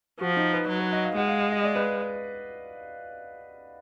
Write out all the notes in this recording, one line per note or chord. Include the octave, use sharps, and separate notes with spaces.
F3 F#4
D#4
B4
F#3
B4
D#5
F5
G#3 F#5
F5
F5
D#5
D5
B4